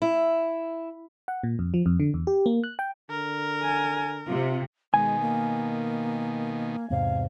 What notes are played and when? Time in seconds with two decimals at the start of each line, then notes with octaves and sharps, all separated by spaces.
0.02 E4
1.28 F#5
1.43 A#2
1.59 F2
1.74 F3
1.86 F2
2.00 D3
2.14 E2
2.27 G4
2.46 A#3
2.64 F#6
2.79 G5
3.10 D3 A#4
3.62 G#5
4.27 C3 F4
4.94 B2 D#3 G#3 G#5
5.21 A#3
6.90 E2 G#2 C3 F5